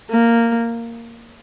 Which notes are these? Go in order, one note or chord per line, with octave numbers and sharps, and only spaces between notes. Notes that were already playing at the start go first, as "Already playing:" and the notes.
A#3